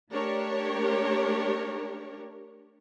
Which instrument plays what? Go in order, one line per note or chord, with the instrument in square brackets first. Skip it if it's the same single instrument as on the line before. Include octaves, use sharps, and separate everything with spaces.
[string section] A3 D4 G4 A#4 C#5